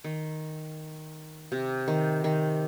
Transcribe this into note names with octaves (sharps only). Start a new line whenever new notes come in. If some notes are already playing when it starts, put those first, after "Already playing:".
D#3
C3
D#3
D#3